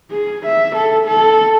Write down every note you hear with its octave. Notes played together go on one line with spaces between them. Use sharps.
G#4
E5
A4
A4